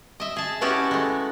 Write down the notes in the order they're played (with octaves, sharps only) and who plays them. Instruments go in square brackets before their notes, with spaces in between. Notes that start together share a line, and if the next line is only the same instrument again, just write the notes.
[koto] D#5 E5
G#4 A5
B3 C#4 E4 F#4 G4 A5
G#3 A3